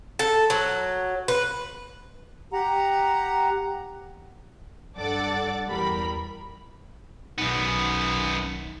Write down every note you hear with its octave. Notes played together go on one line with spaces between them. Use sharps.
A4
F#3
B4
G4 F#5 A#5
G2 A4 D5 F#5 D6 A6
E2 G3 A#4 B5
B1 F#2 D#3 B3